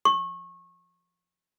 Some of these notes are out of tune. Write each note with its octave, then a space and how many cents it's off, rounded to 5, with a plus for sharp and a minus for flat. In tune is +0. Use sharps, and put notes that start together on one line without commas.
C#6 -25